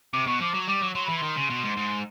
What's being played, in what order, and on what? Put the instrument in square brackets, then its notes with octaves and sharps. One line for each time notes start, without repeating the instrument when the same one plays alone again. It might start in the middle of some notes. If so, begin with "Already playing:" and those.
[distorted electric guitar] C3 [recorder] D6
[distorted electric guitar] B2 [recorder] C#6
[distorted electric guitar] F3 [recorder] D6
[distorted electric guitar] F#3
[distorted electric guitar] G3 [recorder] D6
[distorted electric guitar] F#3
[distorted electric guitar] F#3 [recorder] C6
[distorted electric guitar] E3 [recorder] B5
[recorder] C6
[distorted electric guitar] D#3
C#3
B2
G#2
G#2